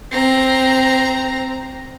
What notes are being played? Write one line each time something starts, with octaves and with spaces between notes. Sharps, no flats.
C4 A#5